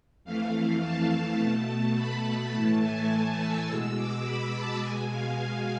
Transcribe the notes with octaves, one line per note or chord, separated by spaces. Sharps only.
F2 E3 A3 F5
A5
B2 A3
B5
A2 E3 A3 A5
G#5
A5
E6
B2 G#3 E6
D6
B5
A5
B2 G#3 G#5
F5
F5